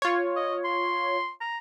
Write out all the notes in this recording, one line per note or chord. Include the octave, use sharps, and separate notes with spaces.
F4 C#5
D#5
C6
A#5